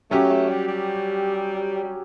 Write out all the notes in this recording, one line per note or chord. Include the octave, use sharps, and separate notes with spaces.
F#3 A3 C#4 G4
A3
G3
G3
G3